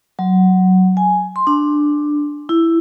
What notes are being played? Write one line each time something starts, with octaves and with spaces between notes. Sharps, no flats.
F#3
G#5
C6
D4
E4